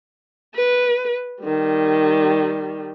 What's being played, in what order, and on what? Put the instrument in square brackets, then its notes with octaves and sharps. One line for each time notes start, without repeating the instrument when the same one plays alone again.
[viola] B4
D#3 G3